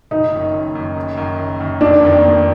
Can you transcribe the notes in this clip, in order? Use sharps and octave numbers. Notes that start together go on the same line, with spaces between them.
F#1 D#4
F#2 D#3
F#1
F#2 D#3
F#1
F#2 D#3
F#1
F#2 D#3
F1 D4
F2 D#3 A#3
F1